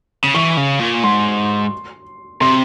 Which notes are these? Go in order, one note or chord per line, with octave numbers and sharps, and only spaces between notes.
C#3
E3 C#6
C#3
A#2
G#2 C6
C3 C6